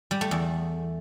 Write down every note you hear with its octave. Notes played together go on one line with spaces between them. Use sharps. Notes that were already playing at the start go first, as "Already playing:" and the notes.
G3
A3
E2